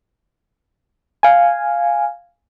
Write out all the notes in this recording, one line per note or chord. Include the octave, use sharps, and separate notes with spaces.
F5 G#5